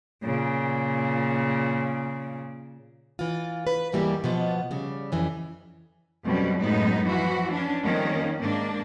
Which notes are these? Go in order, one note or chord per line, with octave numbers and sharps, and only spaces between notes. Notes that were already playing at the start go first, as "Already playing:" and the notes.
A#2 C#3
E3 F4
B4
D#2 G#2 E3 G3 A#3 G4
B2 F3 B3
C#3 G3
F2 E3 C#4
F2 B2 F#3 G3 C#4
F#2 A2 G#3 B3 D#4
E3 F3 F#4
C#4 D4
F2 D#3 G3 A#3 C#4
G#2 A#3 D4